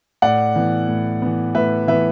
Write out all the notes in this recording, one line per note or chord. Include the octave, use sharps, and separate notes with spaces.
A2 D5 F#5
E3 B3
A2
E3 B3
A2 B4 E5
E3 B3 B4 E5